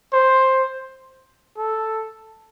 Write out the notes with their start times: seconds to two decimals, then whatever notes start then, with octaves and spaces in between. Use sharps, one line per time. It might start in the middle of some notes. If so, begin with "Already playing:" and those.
0.13 C5
1.58 A4